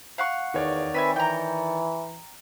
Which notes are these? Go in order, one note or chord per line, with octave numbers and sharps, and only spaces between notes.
F5 F#5 C#6
E2 D#3 C#5 D5
C4 B4 E5 G#5
E3 G5 A#5